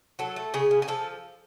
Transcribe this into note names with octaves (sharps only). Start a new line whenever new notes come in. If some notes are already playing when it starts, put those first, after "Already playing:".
F#3 A4
A3
C#3 G#4
C#3
G#4
F3 A4